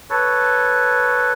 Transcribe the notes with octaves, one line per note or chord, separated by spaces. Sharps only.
A4 B4 C#5